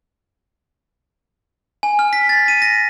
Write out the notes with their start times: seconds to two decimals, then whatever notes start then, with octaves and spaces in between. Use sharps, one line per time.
1.83 G#5
1.99 F6
2.13 B6
2.29 A6
2.48 D#7
2.62 A#6